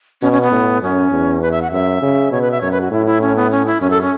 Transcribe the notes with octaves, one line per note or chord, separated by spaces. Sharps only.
B2 C#4
C#4
B3
A2
F#2 C#4
E2
B4
E5
F#5
F#2 E5
C#3
B2 C#5
B4
E5
F#2 C#5
B4
F#4
A2 E4
E4
C#4
B3
C#4
E4
F#2 C#4
A4
C#4